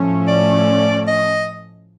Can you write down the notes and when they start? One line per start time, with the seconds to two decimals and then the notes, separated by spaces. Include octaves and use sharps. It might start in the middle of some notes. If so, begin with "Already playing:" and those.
Already playing: A2 F3 A3 C#4
0.28 D5
1.07 D#5